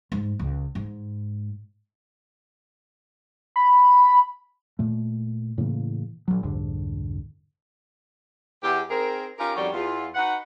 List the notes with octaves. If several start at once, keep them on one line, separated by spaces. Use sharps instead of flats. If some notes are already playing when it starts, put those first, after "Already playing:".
G#2
C#2
G#2
B5
A#2 A3
A2 C#3 E3 A#3
A#1 F#3
F1 C2 G#2 D3
E2 G4
C4 D#4 G#4 A#4
C#4 D#4 F4 G4 A#4
F2 D#3 G3 C#4 F#4 D5
E2 F4
D#4 F#4 B4 F#5